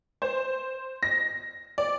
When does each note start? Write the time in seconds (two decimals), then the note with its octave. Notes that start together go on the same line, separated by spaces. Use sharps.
0.22 C5
1.03 A#6
1.78 D5